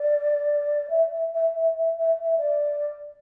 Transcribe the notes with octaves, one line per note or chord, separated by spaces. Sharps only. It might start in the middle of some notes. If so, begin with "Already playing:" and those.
Already playing: D5
E5
E5
E5
E5
E5
E5
E5
D5